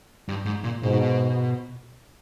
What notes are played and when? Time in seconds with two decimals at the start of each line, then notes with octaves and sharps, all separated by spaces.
0.29 G2
0.46 G#2
0.64 A#2
0.82 G#2 B2